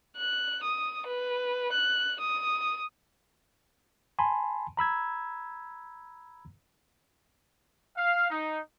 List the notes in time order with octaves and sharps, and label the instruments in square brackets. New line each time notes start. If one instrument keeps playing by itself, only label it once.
[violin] F#6
D#6
B4
F#6
D#6
[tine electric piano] G#5 A5 B5 C6
A#5 B5 E6 G#6
[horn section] F5
D#4